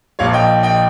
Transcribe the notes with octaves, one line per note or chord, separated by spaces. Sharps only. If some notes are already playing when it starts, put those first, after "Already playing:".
A#1 A#2 F3 C#5 F5
D#5 G5
D#5 G5